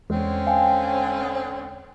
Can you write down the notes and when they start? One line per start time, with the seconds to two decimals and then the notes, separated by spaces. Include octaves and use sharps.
0.10 E2 D3 G#3 C4 C#4
0.47 F5 G5 G#5